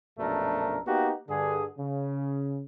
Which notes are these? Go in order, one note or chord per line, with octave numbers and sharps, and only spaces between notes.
A#1 F#2 B2 A3 D4 A#4
A#3 B3 D#4 F#4 G4
G2 D3 G#4
C#3